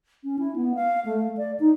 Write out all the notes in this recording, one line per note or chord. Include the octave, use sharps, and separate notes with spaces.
C#4
E4
B3
F5
A3
D5
D#4